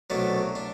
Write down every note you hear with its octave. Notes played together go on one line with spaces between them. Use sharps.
C2 B2 F#3 A3 D4
D4